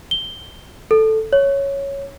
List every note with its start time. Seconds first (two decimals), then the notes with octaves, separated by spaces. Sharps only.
0.11 G7
0.91 A4
1.33 C#5